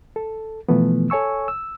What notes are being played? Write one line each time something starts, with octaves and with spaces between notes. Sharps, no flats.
A4
B2 E3 F3 A3 B3
A4 C#5 G#5 C#6 E6
E6